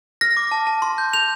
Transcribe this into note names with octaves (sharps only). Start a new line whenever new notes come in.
F6 A#6
D6
A5
A5
C6
G6
G6 F7